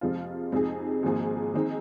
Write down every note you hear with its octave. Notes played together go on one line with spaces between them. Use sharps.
F2 C3 F3 G#3 F4
F2 C3 G#3 D#4 G#4
G#1 G#2 F3 A#3 G#4
G#2 D#3 C4 D#4 G#4